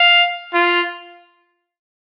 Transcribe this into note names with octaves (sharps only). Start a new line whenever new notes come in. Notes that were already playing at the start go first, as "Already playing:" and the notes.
Already playing: F5
F4